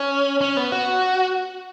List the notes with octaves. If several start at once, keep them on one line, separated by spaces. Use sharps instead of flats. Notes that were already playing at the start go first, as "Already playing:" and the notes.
Already playing: C#4
C#4
B3
F#4